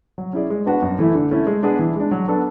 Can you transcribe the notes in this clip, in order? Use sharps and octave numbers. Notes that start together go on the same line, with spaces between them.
F#3
C#4 E4 G#4 D5
G#3
B3 D4 F#4 B4
F#2
E3 A3 E4
D3
A3 C#4 E4
G#3
B3 D4 G#4 B4
E3
G#3 D4
F#3
B3 D4 A4